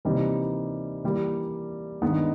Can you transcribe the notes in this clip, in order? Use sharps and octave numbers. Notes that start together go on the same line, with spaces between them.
C3 E3 G3 A#3 D#4
E3 G3 A#3
G2 D#3 G#3 B3 D#4